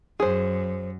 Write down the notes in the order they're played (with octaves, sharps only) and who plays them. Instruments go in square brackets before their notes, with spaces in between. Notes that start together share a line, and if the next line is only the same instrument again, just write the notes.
[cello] F#2 [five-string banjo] G#4 C5